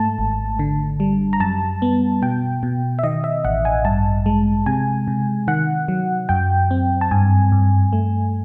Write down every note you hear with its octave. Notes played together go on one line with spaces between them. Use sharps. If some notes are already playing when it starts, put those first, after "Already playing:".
Already playing: G#2 A3 A5
G#1
D3
G3
A#5
F#2 A5
B3
B2 G5
B2
E5
D#3 D#5
E5
A1 F#5
G#5
G2 A5
G#3
C3 G#5
C3
D#3 F#5
F#3
F#2 G5
C4
A5
G2 G#5
G2
A3